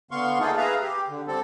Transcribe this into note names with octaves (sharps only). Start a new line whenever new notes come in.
D3 B3 F5 C6 C#6
A3 A#3 D#4 F4 G#4 A4
G#4 B4 E5 F5 A#5
G4
D3
G3 C4 A4